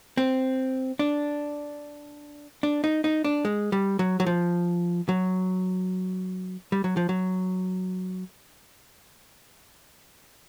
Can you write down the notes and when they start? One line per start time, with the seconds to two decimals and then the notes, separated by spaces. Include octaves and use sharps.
0.17 C4
0.99 D4
2.63 D4
2.84 D#4
3.04 D#4
3.24 D4
3.45 G#3
3.72 G3
3.99 F#3
4.20 F#3
4.26 F3
5.09 F#3
6.72 G3
6.84 F#3
6.97 F3
7.09 F#3